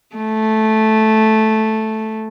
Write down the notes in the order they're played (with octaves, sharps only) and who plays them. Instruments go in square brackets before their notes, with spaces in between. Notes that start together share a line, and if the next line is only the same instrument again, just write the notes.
[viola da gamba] A3